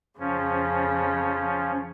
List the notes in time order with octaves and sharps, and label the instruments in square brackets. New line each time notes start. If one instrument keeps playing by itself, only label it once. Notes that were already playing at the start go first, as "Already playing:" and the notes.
[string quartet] F2 C#3 [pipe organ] F3 C#4